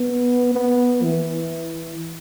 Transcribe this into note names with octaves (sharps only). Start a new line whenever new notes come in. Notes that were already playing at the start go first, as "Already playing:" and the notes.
Already playing: B3
B3
E3